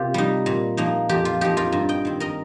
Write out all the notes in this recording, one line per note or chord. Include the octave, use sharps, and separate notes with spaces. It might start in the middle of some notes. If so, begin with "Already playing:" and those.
Already playing: C3 A#3 F4 G4
G3 D#4
A#2
F3 A#3 D#4
F2 G4
F4
F3 D#4 G4
F4 A#4
G2
D#5 G5
D#3 C4
A#4 D#5